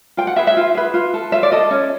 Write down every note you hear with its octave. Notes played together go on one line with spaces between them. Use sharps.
F4 G5
F#5
G#4 B4 E5
E5
F4
G#4 B4
F4
A4
F4 E5
D5
A4 D#5
C#4